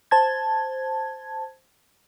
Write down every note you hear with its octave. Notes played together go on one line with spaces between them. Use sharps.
C5 A5 G#6